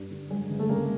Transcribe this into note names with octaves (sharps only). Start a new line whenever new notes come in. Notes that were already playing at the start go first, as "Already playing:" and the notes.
Already playing: G2
D3
F#3 G#3
G1
A3
C#3 G#3 A#3